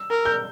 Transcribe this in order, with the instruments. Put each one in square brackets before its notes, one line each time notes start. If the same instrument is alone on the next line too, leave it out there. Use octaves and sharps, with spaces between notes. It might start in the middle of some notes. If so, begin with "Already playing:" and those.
Already playing: [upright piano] E6
[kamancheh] A#4
[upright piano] G6